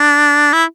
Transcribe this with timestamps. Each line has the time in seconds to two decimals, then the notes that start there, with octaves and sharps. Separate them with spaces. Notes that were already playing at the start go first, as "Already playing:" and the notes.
Already playing: D4
0.53 E4